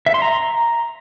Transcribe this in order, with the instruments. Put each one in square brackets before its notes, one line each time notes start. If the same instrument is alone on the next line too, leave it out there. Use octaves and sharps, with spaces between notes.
[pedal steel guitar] E5
C6
A#5